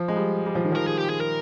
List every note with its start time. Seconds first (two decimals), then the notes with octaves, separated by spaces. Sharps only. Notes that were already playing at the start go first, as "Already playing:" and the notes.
Already playing: F3
0.08 G#3
0.16 G3
0.46 G3
0.55 F3
0.64 D#3
0.72 F3 A#4
0.87 G#4
0.99 G4
1.10 G#4
1.21 A#4